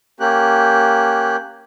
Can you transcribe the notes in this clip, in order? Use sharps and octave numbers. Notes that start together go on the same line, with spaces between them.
A#3 C#4 G4 F#6